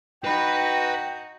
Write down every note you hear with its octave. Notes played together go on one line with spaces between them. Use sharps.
D#4 F#4 B4 G5 B5